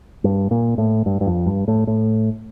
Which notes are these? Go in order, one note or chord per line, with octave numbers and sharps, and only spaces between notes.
G2
A#2
A2
G2
G2
F2
G2
A2
A2